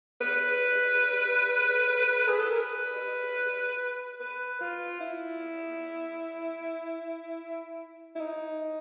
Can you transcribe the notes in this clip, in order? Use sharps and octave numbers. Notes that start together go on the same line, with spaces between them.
B4
G#4
A4
A#4
B4
B4
F4
E4
E4
D#4